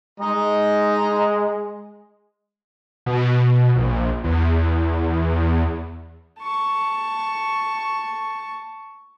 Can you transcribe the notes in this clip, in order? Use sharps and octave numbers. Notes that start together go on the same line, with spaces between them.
G#3 D#5 A#5
B2
A#1
E2
A5 C#6